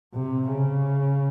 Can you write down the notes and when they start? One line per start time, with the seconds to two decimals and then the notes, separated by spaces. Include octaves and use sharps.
0.14 C3
0.51 C#3